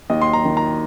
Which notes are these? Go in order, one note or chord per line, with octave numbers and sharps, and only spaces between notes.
D#2 D#5
C6
A#5
D#3
A#5